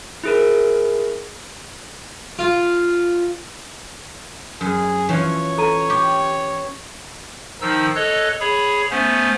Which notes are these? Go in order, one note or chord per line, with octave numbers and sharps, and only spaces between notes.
E4 G#4 A#4
F4
F#2 G#4
E3 F3 C#4 C#5
A4 A#5 D#7
G4 C#6 D6
D#3 F3 D#4 E6
A4 C#5 D#5 F#6
G#4 C#5 B5
A3 B3 C#4 C5